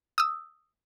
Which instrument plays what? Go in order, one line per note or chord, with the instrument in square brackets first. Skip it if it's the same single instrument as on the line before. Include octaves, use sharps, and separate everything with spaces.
[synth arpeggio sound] D#6 E6